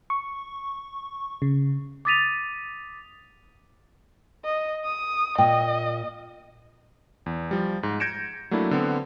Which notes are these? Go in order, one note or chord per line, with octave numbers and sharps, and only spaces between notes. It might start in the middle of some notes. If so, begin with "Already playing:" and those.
C#6
C#3
D6 D#6 A6 B6 D#7 F7
D#5
D#6
A#2 D#5 G5
E2
F3 G3
G#2
G6 G#6 A#6 C#7 D7 E7
F#3 A3 A#3 D4 E4
D3 B3 C4